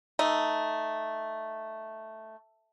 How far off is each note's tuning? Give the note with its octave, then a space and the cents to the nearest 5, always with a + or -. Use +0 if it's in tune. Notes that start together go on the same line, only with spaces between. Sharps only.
A3 +0 D#4 +0